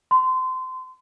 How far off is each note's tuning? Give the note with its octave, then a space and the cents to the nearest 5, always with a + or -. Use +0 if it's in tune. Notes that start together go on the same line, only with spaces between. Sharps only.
C6 -25